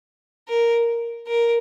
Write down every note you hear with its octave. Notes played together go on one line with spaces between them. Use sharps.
A#4
A#4